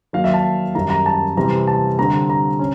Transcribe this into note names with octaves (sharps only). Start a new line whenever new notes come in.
D#3 F#3 A#3 F5
E5
A5
F#2 D#3 G3 A#5
A#5
A5
C3 E3 G3 C4 A#5
A5
D3 G3 C4 A#5
A#5
C#4